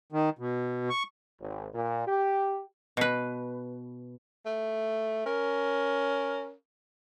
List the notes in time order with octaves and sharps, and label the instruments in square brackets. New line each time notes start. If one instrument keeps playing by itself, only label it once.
[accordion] D#3
B2
C#6
[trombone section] G#1
A#2
G4
[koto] B2 B4
[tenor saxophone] A3
[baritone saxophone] C#4 [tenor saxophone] A#4